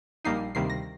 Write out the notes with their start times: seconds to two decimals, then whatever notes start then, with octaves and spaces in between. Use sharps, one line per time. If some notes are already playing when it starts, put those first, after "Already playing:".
0.25 A#1 A#2 G3 A#3 D#4 C7
0.55 D2 C3 D#3 G3 A#3 C7
0.70 A#6